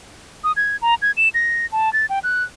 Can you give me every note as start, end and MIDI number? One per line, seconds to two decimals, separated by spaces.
0.44 0.52 87
0.57 0.77 92
0.82 0.95 82
1.02 1.11 92
1.17 1.29 100
1.34 1.66 94
1.72 1.92 81
1.93 2.06 93
2.10 2.19 79
2.24 2.43 90